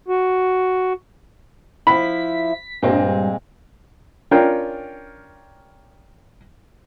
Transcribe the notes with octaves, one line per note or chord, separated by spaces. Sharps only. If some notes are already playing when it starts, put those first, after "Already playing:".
F#4
F3 E4 B5 B6
G2 A#2 G#3 C4
C#4 D4 F4 A#4 G5